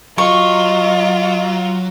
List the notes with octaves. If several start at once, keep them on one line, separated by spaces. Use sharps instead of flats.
F#3 F4 D#5 C#6